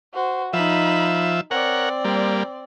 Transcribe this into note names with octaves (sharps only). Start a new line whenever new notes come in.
F#4 C5
F3 D#4 E5 B5
C4 A#4 C#5 D5 F#5
G3 A#3